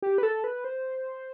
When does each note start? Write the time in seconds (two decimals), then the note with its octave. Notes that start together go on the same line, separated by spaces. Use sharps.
0.02 G4
0.18 B4
0.23 A4
0.44 B4
0.64 C5